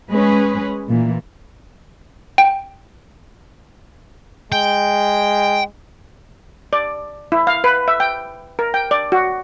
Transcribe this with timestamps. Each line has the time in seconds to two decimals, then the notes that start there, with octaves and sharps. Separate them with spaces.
0.11 G#3 C#4 G#4 B4
0.88 A#2 E3
2.38 G5
4.52 G#3 G5
6.73 D5
7.32 E4
7.47 F5
7.64 B4
7.88 E5
8.00 G5
8.59 A#4
8.74 G5
8.91 D5
9.12 F#4